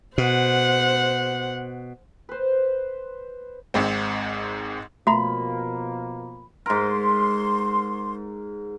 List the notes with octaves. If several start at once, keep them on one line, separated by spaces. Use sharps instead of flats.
B2 C5 F#5
B4 C5
G#1 G#2 C4
B2 F3 A3 A#3 F#4 A#5 B5
G#2 A#4 C6